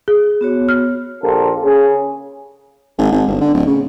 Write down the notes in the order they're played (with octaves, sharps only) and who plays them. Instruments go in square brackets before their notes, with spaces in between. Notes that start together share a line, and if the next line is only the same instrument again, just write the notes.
[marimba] G#4
[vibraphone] B3 F#4 C#5
[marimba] F6
[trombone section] A#1 F4 G4 A4 A#4
C#3 G#4
[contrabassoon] G#1
G#1
G1
D3
D1
C#3